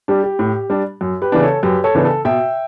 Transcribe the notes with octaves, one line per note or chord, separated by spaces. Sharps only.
G3 D4 G4
G4
A2
G3 D4
F#2
G4 B4
C#3 E3 B3 D4
A4 C#5
F#2 G4 B4
A4 C#5
C#3 E3 B3 D4
A4
B2 E5 G5